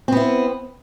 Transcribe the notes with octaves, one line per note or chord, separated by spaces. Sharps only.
B3 C4 E4